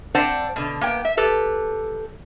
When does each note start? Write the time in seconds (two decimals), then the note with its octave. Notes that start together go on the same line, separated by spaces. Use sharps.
0.15 C4 D4 C5 D5 F#5
0.56 B2 D3
0.81 A#3 B3 G5
1.05 E5
1.17 G4 A4 B4